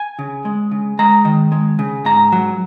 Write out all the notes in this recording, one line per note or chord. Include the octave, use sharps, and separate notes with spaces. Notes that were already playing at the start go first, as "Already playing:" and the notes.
Already playing: G#5
C#3
G#3
C#3
G#3 A#5
D#3
G#3
C#3
G#2 A#5
F#3